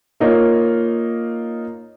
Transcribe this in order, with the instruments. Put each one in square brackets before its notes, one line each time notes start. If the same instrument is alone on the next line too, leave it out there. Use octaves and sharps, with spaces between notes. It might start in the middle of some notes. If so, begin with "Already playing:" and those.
[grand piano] A#3 D#4 F4 C#5